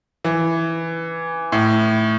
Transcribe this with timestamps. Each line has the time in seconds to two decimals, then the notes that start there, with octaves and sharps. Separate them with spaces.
0.24 E3
1.52 A2